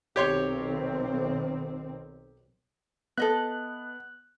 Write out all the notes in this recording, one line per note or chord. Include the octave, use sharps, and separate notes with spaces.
B1 D#3 C4 G4 C#5 C6
B3 A4 D#5 E5 F#6